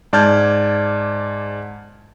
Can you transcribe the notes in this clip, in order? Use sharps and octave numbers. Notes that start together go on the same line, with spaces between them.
G#2 D5 A5 F6 G6 G#6